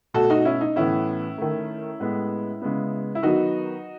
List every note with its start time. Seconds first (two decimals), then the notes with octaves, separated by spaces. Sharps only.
0.14 B2 A3 F#4 A4
0.30 D#4 F#4
0.45 C#4 E4
0.61 D#4
0.76 A2 E3 B3 C#4 E4
1.38 D#3 A3
2.00 A2 G#3 B3
2.62 C#3 G#3 B3
3.15 E4
3.23 D#3 F#3 B3 D#4 F#4